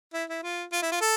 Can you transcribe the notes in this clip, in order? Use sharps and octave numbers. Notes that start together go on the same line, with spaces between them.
E4
E4
F4
F4
E4
F4
A4